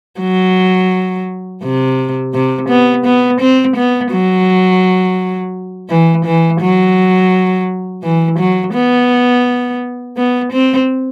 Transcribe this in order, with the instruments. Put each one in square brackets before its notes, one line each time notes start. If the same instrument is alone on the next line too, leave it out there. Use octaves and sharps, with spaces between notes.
[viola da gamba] F#3
C3
C3
B3
B3
C4
B3
F#3
E3
E3
F#3
E3
F#3
B3
B3
C4